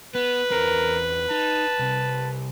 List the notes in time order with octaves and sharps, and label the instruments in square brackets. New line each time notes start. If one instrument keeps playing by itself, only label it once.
[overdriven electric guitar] B3 [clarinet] B4
[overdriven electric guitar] E2 C4 [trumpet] A#4
[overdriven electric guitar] D#4 [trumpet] A5
[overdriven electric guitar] C2 C3